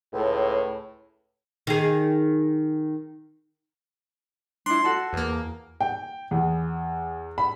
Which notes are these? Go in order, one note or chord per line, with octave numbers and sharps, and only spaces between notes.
C#2 A2
D#3 G#4
D4 E4 C6
F#4 A4 A5
E2 A#3
G5
E2
B5